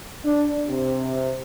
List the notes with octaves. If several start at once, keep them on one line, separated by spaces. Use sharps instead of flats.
D4
C3